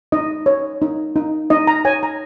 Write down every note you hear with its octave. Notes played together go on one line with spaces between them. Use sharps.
D#4 D#5
C#5
D#4
D#4
D#4 D#5
A#5
C#5 G#5
A#5